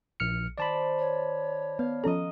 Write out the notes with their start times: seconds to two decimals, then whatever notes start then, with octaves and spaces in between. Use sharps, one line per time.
0.20 A#1 F6 C#7
0.58 D#3 C5 D5 A5 B5
0.99 C#5
1.79 B3 F5
2.04 F3 C#4 A4 D#5 A#5